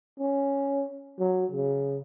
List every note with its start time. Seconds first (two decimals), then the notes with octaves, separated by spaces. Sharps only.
0.20 C#4
1.19 F#3
1.52 C#3